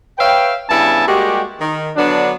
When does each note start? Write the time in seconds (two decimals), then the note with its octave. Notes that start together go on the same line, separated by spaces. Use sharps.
0.19 B4 C#5 E5 F5 G5
0.70 G2 C#3 B3 E4 G#5 A5
1.06 G3 G#3 A#3 F#4 G4
1.61 D#3
1.96 D3 F#3 B3 D4